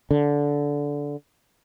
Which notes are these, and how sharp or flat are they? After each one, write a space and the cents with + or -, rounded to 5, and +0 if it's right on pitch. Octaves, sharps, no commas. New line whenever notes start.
D3 -15